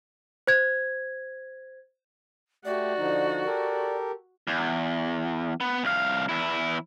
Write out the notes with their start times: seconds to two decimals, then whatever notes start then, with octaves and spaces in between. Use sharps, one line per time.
0.47 C5 G#6
2.65 A3 F#4 G4 D5
2.98 D3 F3 D#4
3.45 G4 A4 A#4
4.47 E2
5.61 B3
5.84 C2 F5
6.29 E2 E4